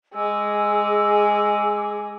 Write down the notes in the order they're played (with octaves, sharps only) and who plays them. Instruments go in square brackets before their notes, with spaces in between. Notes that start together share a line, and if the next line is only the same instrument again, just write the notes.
[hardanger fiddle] G#3 [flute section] G#4 D6 E6